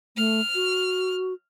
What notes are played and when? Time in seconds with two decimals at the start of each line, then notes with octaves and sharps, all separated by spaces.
0.17 A3 F6
0.55 F#4